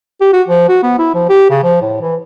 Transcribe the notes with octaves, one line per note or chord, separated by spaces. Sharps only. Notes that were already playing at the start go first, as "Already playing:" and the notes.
G4
F#4
F3
F#4
B3
E4
F3
G4
C#3
F3
A2
E3